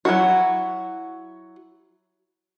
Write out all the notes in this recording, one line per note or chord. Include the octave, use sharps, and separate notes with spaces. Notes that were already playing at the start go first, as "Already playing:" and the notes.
F#3 E4 F#4